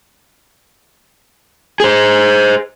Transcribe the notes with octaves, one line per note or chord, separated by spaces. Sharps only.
G#4 C5